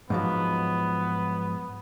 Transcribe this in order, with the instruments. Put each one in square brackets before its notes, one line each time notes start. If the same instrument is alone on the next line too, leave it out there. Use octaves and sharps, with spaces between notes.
[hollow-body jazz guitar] G#2 F3 F#3 [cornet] B3